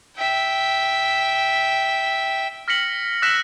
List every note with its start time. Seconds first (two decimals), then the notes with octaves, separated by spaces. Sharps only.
0.16 E5 G5
2.68 F6 A#6 B6 C#7 F#7
3.22 E6 F#6 A#6 B6 E7